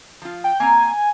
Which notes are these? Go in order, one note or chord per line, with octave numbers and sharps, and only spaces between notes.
F3 F4
G5
A#3 C4 G#5 A#5